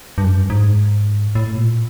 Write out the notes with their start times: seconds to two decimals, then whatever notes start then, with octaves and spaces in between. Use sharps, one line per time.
0.18 G2
0.24 F#2
0.37 G2
0.50 G#2
1.35 A2
1.55 A#2